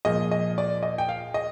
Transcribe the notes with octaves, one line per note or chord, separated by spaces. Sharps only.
A#2 F3 G#3 D#5
D#5
D5
D#5
G5
F5
D#5